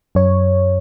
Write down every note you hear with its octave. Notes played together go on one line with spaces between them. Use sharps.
F#2 C#5